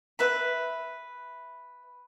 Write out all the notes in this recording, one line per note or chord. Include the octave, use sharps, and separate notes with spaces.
B4 E5 B5